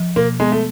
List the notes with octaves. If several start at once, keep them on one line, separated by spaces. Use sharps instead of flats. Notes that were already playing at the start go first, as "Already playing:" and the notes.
Already playing: F3
B2 A#3
G#3 B3
A3